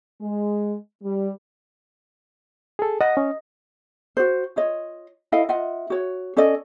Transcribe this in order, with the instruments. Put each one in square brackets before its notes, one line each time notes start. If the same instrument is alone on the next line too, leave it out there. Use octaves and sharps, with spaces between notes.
[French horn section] G#3
G3
[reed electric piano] G#4 A4
[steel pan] D#5 [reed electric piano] F#5 D#6
[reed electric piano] C#4
[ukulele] F#4 C5
F4 C#5 D#5
E4 A4 D#5 F5
F4 D#5 E5 F#5
F#4 C#5
C#4 A4 D5 D#5